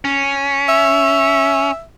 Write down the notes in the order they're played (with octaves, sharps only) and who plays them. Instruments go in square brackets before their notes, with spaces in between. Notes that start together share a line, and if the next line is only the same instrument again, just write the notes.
[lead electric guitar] C#4
[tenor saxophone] E5